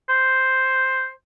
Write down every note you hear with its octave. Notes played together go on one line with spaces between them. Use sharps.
C5